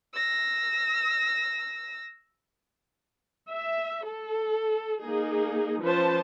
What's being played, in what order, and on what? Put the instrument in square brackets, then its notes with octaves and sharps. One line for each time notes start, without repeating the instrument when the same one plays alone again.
[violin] E6 A#6
[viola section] E5
A4
A#3 D#4 G#4
F3 C#4 B4 C5 A5